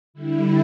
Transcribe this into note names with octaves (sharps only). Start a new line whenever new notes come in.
D3 G3 E4